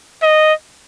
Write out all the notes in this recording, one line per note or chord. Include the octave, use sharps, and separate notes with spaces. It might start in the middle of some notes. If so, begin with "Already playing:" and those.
D#5